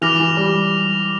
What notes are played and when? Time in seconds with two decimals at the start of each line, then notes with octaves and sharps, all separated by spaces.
0.02 E3 D6 F6 A#6 F7
0.20 E3
0.37 G3